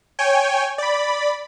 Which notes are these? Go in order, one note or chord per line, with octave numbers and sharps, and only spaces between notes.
C#5 G5 G#5
D5 B5